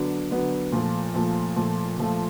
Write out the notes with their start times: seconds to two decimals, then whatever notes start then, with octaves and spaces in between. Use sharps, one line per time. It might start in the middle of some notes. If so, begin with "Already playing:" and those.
Already playing: D3 F#3 B3 D4
0.31 D3 F#3 B3 D4
0.72 A#2 F3 A3
1.14 A#2 F3 A3
1.56 A#2 F3 A3
1.98 A#2 F3 A3